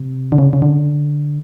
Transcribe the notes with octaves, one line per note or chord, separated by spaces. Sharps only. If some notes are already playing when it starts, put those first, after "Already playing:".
Already playing: C3
D3
C#3
C#3
D3